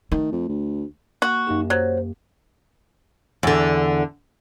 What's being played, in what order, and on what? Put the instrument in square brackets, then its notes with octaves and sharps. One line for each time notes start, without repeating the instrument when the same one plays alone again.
[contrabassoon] D#3 [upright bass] A3
[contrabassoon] F2
D2
[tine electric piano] A#3 [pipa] F#4
[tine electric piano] F#2 A#3 G4 [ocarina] D#4
[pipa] F#3 [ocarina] C5
[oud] E2 D3